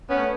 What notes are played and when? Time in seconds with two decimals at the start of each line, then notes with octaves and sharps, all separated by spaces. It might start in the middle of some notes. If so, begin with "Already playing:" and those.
0.07 B3
0.10 C#4
0.13 A3